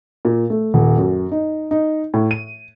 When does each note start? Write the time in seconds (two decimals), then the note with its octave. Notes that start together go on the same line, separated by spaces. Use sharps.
0.25 A#2
0.50 A3
0.74 D#1
0.98 F#2
1.32 D#4
1.71 D#4
2.14 A2
2.31 D#7